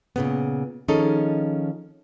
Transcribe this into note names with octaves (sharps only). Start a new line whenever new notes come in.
A#2 C#3 B3
D#3 F3 C#4 D#4 G#4 A4